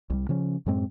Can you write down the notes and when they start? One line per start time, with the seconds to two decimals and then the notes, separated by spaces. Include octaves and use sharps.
0.10 C2 G3
0.29 C#3 F3 C#4
0.66 F#2 A2 G#3 C4